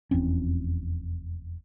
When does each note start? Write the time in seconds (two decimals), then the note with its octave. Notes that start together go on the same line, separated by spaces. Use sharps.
0.11 F1 E2 C4 C#4